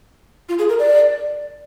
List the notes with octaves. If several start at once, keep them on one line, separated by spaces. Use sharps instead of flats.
F4
G#4
A#4
D5